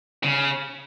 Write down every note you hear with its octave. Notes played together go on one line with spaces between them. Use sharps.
C#3